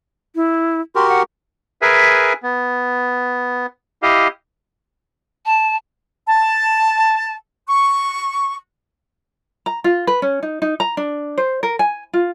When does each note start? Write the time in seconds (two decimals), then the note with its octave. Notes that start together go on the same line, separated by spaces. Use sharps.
0.35 E4
0.95 F#4 G4 A#4 C6
1.09 F#5
1.82 G#4 A#4 B4 E5 G#5
2.43 B3
4.02 E4 G4 D#5 F5
5.45 A5
6.27 A5
7.67 C#6
9.66 A#5
9.84 F4
10.07 B4
10.22 C#4
10.43 D#4
10.62 D#4
10.80 A#5
10.97 D4
11.38 C5
11.63 A#4
11.79 G#5
12.13 F4